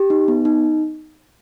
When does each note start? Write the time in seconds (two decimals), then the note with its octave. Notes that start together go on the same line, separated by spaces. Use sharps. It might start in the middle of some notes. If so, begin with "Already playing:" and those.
Already playing: G4
0.10 D#4
0.28 B3
0.45 D#4